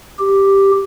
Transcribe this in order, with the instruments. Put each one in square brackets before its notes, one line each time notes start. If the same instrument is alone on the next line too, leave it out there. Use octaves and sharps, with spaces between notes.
[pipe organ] G4